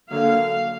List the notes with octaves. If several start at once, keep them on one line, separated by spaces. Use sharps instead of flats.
D3 F#3 A#3 F5